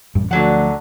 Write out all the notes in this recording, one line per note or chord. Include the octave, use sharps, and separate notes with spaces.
A1 F#2 G3
D2 D3 F3 F#3 F#5